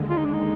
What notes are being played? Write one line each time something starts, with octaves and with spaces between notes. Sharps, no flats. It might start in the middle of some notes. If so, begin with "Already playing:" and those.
Already playing: D#2 D3 G#3
F4
D#4
D4
D#4